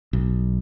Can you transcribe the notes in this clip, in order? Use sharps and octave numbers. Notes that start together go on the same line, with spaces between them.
B1